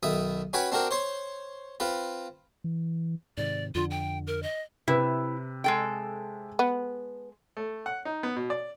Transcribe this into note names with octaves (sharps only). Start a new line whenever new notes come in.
B1 D#3 E5 D#6
C#4 F#4 B4 G5 G#5 B5
C4 D4 F#4 A#4 G5
C5 C#5 C6
C4 F4 B4
E3
G#2 C3 D#3 D5
F2 D3 F4
G5
A#4
D#5
C3 E4 B4
G#3 A4 G5
B3
A3
F#5
D#4
B3
B2
D5